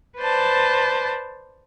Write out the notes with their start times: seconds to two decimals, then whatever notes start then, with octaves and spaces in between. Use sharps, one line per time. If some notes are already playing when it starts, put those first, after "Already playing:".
0.18 B4 C5 D5 A5